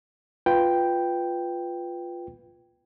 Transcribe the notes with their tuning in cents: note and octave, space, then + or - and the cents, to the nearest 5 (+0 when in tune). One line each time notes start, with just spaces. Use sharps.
F4 +0 B4 +0 G5 +0